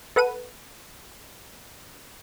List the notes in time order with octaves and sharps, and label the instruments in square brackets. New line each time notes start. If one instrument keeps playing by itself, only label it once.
[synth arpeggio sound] A4 B4 F#5 D#7